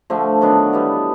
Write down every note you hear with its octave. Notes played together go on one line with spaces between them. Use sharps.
D3 F3 A3
D#3 F#3 B3 D4
E3 G3 B3